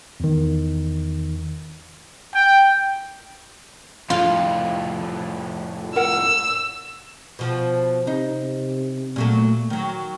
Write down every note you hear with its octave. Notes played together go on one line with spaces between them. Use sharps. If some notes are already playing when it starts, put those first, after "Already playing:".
E2 D#3
G5
F2 A2 F4
A#4 F#5 E6
B2 F3
C3 D#4
A#2 F#3 A3
D#3 F#3